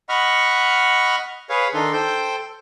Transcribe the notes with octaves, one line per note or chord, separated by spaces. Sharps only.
D#5 F#5 B5 C#6 F6
G#4 B4 C#5 F5
D#3 D4 D#4 A4 C6
A4 C5 G5 G6